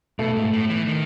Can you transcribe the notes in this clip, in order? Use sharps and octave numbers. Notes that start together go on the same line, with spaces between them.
B2 A3
G#2
A2
E3
D#3